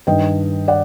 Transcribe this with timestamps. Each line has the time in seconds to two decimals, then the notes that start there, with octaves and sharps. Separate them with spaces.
0.07 G2 D#3 D#5 G5
0.68 D5 F#5